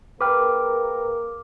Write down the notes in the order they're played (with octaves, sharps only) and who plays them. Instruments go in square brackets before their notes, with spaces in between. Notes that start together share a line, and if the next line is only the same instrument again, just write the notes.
[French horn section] A#3 G#4 A#4 [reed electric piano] B4 G5 [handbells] D6 F6